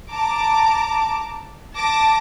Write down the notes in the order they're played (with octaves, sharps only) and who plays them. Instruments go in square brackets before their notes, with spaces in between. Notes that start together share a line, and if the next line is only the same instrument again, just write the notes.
[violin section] A5 A#5 D6
A5 D6 A#6